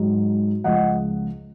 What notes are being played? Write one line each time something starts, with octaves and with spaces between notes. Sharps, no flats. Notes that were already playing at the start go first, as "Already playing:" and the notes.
Already playing: G#2 F#3
C#2 C#3 F3 D#5 F#5